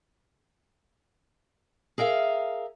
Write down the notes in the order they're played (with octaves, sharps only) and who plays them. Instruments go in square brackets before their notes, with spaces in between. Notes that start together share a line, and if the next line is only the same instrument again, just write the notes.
[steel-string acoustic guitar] G#4 A#4 E5 F5